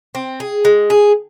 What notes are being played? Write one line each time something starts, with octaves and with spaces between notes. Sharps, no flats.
C4
G#4
G#3
G#4